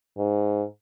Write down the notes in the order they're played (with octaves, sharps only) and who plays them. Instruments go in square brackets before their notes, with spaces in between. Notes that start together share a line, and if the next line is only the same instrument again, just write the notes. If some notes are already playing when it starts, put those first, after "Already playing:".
[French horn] G#2